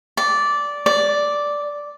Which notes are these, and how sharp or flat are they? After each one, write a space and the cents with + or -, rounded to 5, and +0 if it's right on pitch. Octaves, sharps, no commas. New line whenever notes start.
D5 -10
D5 -5